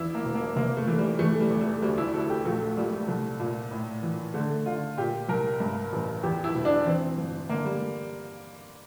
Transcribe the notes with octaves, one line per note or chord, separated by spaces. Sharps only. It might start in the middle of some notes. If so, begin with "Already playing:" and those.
Already playing: E2 E4
A#3
E1
A#3
F1 A#3
A3
E3
G3
E3 A3
G3
E2
A3
D2 G3
E4
D2 A4
G4
A#1 A3
A#2 G3
A3
C2
A#2
A2
E3
D3 A3
D3 F4
A#2 G4
C2 A#4
G2
A1
E2 G4
E4
E1
D4
E3 C4
G1
D3 A#3
G3